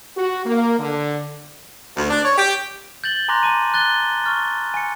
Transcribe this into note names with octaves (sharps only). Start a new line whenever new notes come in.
F#4
A#3
D3
D2
D4
C#5
G4
G6 A6 F#7 G7
G#5 A#5 C6 D6 F#6 A#6
A5 D6 D#7
F#6 A6 G7
C#6 F6 A6
G#5 C#7